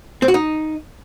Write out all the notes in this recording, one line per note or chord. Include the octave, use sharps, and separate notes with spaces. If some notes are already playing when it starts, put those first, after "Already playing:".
C4
F#4
D#4